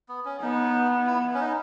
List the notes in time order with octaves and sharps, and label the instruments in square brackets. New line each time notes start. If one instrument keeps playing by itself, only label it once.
[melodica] B3
C#4
[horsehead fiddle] B3 [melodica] D#4
[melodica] E4
C#4
D#4